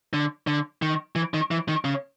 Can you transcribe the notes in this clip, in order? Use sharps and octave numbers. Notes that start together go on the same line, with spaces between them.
D3
D3
D#3
E3
D#3
E3
D#3
C#3